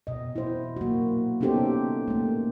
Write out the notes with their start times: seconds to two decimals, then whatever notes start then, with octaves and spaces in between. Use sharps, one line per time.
0.07 B2 D#5
0.36 E4 C5
0.76 A#3 F#4
1.41 B3 C#4 D#4 G4 A4 C5
2.08 A3 A#3